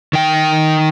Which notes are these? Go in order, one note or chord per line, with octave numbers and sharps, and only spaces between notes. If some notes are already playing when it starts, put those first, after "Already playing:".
D#3 G5